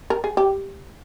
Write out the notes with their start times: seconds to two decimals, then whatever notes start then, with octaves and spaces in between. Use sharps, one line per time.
0.10 A#4
0.24 G#4
0.37 G4